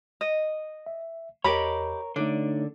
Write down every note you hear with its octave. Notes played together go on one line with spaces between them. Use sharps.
D#5
E5
E2 G4 A#4 C#5 D#5 B5
D3 A3 D4 D#4 C#5